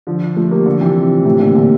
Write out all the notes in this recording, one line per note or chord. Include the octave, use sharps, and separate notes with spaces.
D3 F3
F3 A3
G3 A#3
D3 F3
C3 E3
A2 C3
A#2 D3
A#2 D3